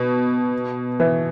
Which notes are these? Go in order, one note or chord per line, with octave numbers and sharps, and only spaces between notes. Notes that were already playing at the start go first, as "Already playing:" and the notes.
Already playing: B2
E3